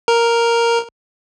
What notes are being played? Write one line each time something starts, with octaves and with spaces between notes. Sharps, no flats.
A#4